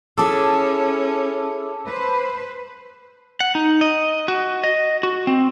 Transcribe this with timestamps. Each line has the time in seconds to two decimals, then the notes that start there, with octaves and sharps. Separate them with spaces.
0.18 C#4 E4 G#4 A4 A5 D6 E6
1.86 B4 C5
3.40 F#5
3.55 D#4
3.81 D#5
4.28 F#4
4.63 D#5
5.03 F#4
5.27 C4